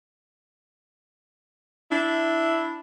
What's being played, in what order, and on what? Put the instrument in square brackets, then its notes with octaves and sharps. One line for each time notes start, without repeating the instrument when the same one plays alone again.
[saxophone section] D4 E4